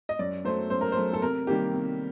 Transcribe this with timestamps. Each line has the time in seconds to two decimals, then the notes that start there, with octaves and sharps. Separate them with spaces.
0.09 D#5
0.19 F#2 D5
0.45 F#3 A3 C5
0.70 F#2 C5
0.81 A#4
0.92 C5
0.97 F#3 A3
1.13 A4
1.22 C3 A#4
1.47 D#3 G3 A#3 G4
1.73 C3